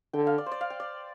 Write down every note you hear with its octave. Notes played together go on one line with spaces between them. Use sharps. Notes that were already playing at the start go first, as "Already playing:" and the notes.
D3 G5
F5
D5
C5
D5
F5
G5
D5